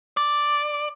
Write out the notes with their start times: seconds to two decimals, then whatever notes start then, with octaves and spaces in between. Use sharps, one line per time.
0.17 D5